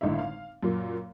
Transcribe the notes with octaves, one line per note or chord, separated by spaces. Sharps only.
G#1 A2 D3 D#4 E5
F5
F#2 A#2